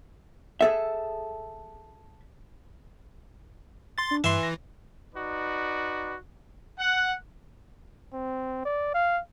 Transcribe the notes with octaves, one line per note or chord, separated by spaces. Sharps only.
G#4 A4 E5
C6 A6
D4
G2 E3 E5 C6
A#6
D#4 F#4 B4 D5
F#5
C4
D5
F5